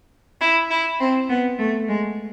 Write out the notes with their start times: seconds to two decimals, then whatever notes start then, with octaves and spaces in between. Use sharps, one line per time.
0.40 E4
0.70 E4
1.00 C4
1.29 B3
1.59 A3
1.88 G#3